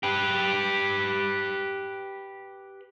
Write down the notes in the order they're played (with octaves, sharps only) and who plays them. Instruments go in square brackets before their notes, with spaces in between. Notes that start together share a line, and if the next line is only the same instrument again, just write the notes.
[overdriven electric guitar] G4 B4